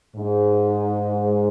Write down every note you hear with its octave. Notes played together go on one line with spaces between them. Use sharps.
G#2